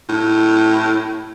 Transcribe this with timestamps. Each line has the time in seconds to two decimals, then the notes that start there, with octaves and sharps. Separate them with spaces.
0.09 A2